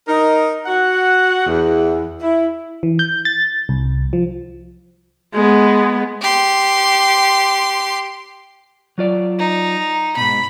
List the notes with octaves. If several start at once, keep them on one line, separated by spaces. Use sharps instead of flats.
D#4 A#4
F#4 F#5
E2
E4
E3
G6
A6
C2
F3
G#3 B3
G4 C6
F#3 F4 D5
D#4
G#2 B2 B5